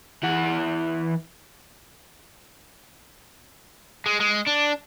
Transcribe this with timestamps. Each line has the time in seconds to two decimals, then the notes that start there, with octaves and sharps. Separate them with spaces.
0.23 E3 F#5
4.06 G#3
4.21 G#3
4.47 D4